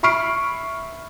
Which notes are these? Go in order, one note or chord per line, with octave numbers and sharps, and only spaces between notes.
E5 B5 C#6 F6 C7 D7